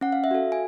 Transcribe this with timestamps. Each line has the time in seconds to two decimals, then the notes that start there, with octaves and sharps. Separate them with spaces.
0.01 C#4 F#5
0.12 F5
0.24 E5
0.31 F#4 A4 F5
0.52 G#5